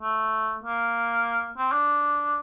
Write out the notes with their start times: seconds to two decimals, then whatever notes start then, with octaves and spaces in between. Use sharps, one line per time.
0.01 A3
0.64 A#3
1.57 C4
1.72 D4